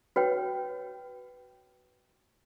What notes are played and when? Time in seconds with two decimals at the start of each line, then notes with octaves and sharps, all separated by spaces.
0.16 F#4 B4 C#5 G5